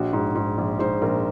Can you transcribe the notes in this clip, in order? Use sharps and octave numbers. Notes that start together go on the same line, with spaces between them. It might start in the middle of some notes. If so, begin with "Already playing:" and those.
Already playing: A#1 F#4
G#2
G#2
A#1
G#2 C5
A#1 A#4